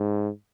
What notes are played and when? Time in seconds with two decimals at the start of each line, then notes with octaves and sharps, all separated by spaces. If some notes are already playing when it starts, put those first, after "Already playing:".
Already playing: G#2